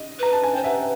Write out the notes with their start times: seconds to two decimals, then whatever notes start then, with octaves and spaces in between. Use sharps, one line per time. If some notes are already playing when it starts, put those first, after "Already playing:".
Already playing: D#5
0.19 B4 A#5
0.33 A5
0.44 G#5
0.54 C5 G5
0.64 B4 E5 F#5